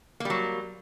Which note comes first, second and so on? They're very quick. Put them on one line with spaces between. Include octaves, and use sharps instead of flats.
A#3 G3 F#3